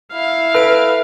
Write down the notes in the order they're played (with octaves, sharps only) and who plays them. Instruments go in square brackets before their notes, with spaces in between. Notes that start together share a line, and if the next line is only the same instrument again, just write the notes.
[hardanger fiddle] E4 [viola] F5
[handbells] A4 D7 [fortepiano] B4